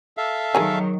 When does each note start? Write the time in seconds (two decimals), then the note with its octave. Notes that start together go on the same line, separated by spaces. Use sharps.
0.17 A4 E5 F5
0.55 D#3 F#3 G#4 A#4 G#5